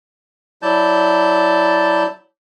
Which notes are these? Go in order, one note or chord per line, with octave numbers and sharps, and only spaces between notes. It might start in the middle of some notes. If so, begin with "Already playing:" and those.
F#3 E4 D5 A5 G6